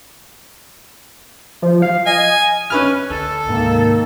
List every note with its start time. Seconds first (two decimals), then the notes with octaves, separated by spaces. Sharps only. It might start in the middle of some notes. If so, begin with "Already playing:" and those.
1.62 F3
1.82 F5
2.06 D#5 G#5
2.70 C#4 B4 F6
3.10 D2 A4
3.49 G#2 C3 D#3 A#3